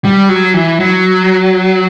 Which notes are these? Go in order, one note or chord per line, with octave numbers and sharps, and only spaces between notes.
G3
F#3
E3
F#3